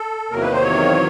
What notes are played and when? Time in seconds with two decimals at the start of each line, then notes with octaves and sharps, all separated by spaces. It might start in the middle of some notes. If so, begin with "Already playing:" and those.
Already playing: A4
0.30 E2 C3 D#3 F#3 A#3 A#4
0.41 B4
0.52 C5
0.63 C#5